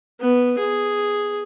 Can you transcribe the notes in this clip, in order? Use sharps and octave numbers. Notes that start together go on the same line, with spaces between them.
B3
G#4